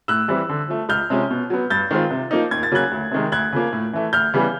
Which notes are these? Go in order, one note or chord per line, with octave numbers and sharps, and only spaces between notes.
A2 E6 F#6
E3 G3 C4 E4
D3
F3 A3
C#2 F6 G6
C3 F3 G#3 C#4
B2
F#3 B3
G2 G6 A6
D#3 G#3 C4 F4
C3
F3 A#3 D#4
D#2 G#6
A6
C#3 F#3 A#3 C#4 F#6 G#6
D2
C3 D#3 G#3
D2 F#6 G#6
C#3 F3 A#3
A2
E3 A3
D2 F6 G6
C#3 E3 G3 B3